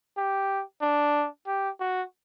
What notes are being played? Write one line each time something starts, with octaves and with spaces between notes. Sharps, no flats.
G4
D4
G4
F#4